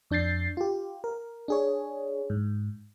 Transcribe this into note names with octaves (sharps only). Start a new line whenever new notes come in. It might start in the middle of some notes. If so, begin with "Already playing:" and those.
F2 D4 G6 A6 C7
F4 G4
A#4
D4 G#4 C#5
G#2